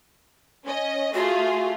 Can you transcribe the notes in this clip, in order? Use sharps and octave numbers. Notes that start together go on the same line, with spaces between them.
C#4 D#5
A3 F4 F#4 G#4